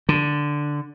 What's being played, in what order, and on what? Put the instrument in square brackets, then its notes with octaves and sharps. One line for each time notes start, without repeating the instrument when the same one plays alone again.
[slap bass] D3